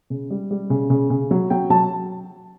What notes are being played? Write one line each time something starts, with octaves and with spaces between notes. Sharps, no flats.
C#3
G3
G3
C#3
C#3
C#3
F#3
F#3 G5
F#3 A5